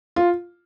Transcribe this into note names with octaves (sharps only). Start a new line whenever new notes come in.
F4